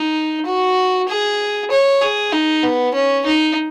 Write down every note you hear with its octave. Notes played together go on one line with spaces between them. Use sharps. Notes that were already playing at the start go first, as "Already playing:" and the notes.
Already playing: D#4
F#4
G#4
C#5
G#4
D#4
B3
C#4
D#4